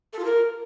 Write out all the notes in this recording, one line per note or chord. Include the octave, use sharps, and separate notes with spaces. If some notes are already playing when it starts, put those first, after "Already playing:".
A4
F4
A#4